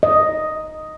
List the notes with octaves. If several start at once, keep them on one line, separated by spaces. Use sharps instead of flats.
D#5